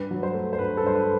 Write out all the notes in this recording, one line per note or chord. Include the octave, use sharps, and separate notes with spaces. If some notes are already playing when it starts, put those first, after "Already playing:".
Already playing: G2 B4
F#3
C5
A3
C5
G2 B4
A4
G2 C5
B4